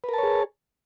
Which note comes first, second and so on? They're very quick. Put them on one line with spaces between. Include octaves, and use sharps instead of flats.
B4 A#4 A5 C#5 G#4